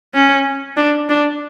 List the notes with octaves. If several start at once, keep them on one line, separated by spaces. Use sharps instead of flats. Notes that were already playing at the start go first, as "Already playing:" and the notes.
C#4
D4
D4